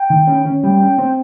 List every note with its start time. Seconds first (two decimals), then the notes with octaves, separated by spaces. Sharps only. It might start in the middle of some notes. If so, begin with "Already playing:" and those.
Already playing: G5
0.10 D#3
0.27 C#4
0.45 C#4
0.63 G3 G5
0.81 C#4
0.98 C4